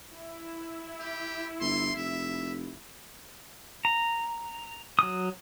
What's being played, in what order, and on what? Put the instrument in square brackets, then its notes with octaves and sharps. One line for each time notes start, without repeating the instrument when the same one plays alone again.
[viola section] E4
[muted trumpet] G4
[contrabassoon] G1 [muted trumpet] C6
[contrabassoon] F1 [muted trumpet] E5
[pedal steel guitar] A#5
F#3 D#6